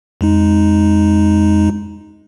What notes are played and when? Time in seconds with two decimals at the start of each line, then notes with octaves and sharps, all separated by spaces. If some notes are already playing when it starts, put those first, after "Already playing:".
0.21 F2 G#3 D#4